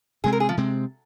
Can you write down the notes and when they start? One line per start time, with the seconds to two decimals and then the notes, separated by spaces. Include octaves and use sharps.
0.24 C3 G#3 C4 G#4
0.33 A#4
0.40 G#4
0.49 F3
0.57 C3 G#3 C4